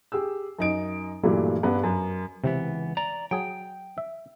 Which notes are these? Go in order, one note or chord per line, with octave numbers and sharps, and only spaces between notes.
G4 G#4 E6
F#2 D#4 D7
G2 A#2 E3 F#3 G3 A3
G2 B3
F#2
C#2 C3 E3 B3
D5 A#5
F#3 G#4 G5 G#5
E5